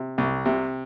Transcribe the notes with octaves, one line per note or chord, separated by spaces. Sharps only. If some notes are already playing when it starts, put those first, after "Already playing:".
Already playing: C3
C2
C3